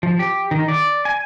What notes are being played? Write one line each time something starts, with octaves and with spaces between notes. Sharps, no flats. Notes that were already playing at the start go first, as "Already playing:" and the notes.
F3
G4
D#3
D5
G#5